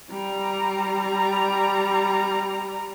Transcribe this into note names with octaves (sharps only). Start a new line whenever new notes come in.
G3 A#5